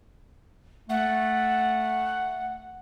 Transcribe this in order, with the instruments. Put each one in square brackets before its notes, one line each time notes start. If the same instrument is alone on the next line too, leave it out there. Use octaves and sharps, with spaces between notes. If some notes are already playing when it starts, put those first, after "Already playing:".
[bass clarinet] A3 [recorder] F#5